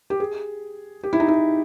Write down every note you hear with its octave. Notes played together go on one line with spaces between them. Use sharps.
G4
G#4
G4
E4
D#4
E4